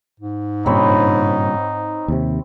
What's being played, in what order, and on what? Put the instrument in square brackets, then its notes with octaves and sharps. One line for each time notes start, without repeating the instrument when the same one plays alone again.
[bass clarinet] G#2
[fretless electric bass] G2 A#2 C#3 [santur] C4 C#5 B5 [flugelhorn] D#4
[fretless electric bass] D#2 C3